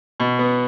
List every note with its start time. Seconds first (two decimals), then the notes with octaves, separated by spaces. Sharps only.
0.20 B2
0.39 B3